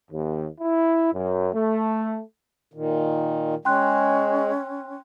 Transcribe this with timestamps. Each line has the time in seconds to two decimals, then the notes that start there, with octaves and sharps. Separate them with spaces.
0.12 D#2
0.61 E4
1.13 F#2
1.54 A3
2.74 A#2 D#3
3.65 G#3 C#4 G5 C6 F#6